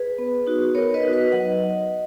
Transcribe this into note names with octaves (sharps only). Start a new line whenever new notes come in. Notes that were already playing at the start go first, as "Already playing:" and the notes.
Already playing: G#4 B4
B3
D#4 F#4
B3 A#4 C#5
B4 D#5
D#4 F#4
B4 D#5
F#3 D#5 F#5